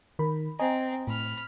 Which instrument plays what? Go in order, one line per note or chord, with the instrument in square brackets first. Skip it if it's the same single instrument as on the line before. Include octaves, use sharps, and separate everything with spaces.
[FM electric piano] D#3 A#4 B5
[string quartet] C4 [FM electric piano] D#5 G#5 A#5
[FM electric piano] A2 [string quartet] B5 F6